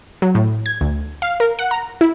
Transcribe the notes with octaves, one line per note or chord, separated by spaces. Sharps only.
F#3
A2
G#6
D2
F5
A#4
F#5
A#5
E4